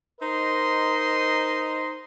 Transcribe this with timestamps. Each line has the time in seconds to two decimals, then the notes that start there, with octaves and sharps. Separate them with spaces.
0.21 D#4 A#4 C5 D#5 C6